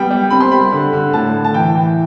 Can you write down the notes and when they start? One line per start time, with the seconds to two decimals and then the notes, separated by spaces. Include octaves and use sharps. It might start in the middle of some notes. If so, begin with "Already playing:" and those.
Already playing: G3 B3 G5
0.10 G3
0.30 C4 B5
0.40 C6
0.51 G3 B5
0.72 D3
0.93 D3
1.13 A2 A5
1.34 A2
1.45 A5
1.54 E3 G5
1.75 E3